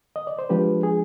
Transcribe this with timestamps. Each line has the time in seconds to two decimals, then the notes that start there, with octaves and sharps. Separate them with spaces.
0.16 D#5
0.27 D5
0.39 C5
0.49 F3 G#3 D4 G4 B4
0.83 G#4